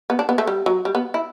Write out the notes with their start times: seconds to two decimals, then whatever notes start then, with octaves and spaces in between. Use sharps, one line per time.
0.10 B3
0.19 D4
0.29 B3
0.38 A3
0.47 G3
0.66 F#3
0.85 G3
0.95 B3
1.14 E4